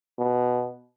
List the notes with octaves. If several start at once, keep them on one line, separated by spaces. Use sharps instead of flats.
B2